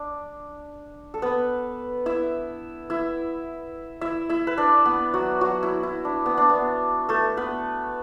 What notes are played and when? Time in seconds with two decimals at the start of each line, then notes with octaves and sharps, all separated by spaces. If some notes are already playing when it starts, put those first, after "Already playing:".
Already playing: D4
1.14 A4
1.22 B3 B4
2.06 E4 E5
2.90 E4 E5
4.01 E4 E5
4.29 E4 E5
4.47 B4
4.58 D4 D5
4.85 B3 B4
5.14 F#3 F#4
5.41 F#3 F#4
5.63 E4
5.83 E4
6.05 D4
6.26 B3
6.38 D4
6.50 B3
7.09 A3 A4
7.37 B3 B4